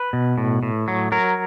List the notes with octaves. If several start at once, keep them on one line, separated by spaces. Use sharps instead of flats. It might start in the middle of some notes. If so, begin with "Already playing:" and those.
Already playing: B4
B2
A2
A2
F#3
F#3 A#4